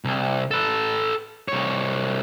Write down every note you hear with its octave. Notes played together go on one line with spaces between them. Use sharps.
C2
A4 B4
C2 C#5